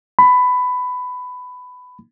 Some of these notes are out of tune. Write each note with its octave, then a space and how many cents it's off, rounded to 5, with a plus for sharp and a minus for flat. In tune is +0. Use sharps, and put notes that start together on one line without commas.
B5 +15